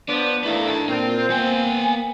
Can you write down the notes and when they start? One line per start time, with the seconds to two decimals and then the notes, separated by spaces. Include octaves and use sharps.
0.09 F3 B3 D4 B4 D5
0.44 D#3 E3 A3 E4 B4 F5
0.68 G5 A5
0.89 A#2 C4 F4 A#4
1.30 A#3 B3 G5 G#5